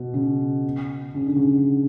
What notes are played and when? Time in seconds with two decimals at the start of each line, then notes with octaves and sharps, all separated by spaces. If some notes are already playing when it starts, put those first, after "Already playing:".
Already playing: B2
0.14 C#3
1.15 C#3
1.26 D3
1.36 C#3